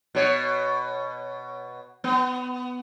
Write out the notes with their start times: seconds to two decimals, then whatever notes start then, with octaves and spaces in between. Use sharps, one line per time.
0.15 B2 C#5
2.04 B3